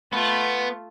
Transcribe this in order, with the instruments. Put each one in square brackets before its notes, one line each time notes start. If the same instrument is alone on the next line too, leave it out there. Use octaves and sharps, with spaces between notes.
[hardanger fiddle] A3 F4 [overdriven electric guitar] B3